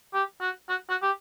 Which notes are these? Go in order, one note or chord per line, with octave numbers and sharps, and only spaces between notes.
G4
F#4
F#4
F#4
G4